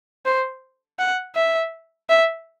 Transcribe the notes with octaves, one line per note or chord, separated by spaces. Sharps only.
C5
F#5
E5
E5